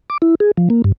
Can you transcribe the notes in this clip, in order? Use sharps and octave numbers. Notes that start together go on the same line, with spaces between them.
D6
E4
G#4
F3
A#3
G2